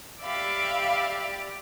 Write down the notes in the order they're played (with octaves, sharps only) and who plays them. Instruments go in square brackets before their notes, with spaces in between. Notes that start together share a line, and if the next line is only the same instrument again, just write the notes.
[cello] G4 D5 [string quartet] E5 F5 B5